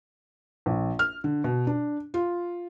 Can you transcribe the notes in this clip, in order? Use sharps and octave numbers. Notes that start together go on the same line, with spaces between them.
A#1
F6
D3
B2
D4
F4